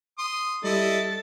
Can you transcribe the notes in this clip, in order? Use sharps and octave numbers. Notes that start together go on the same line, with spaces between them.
C6 D#6
G3 E4 A4 D#5 A6